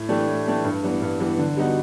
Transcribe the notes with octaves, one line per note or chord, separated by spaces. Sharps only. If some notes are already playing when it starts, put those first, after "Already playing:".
Already playing: A2
E3 A3 D4 G4
A2
E3 A3 D4 G4
G2
E3 G3 B3
G2
E3 G3 B3
D3
G3 B3 D#4 F#4